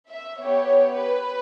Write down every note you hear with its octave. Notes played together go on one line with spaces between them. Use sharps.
E5
B3 G4 C#5
B4